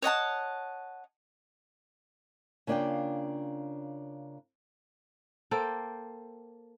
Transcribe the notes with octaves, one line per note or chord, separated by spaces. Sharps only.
C#5 D#5 F#5 A5
C#3 A#3 D4 F4 F5 G5
A#3 A4 C5 G5